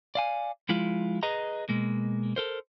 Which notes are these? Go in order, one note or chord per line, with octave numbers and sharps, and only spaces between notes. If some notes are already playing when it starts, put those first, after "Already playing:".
D5 F5 G#5
F3 G#3 E4 F4
G#4 B4 D#5 A#5
B2 G#3 A#3
A4 A#4 C5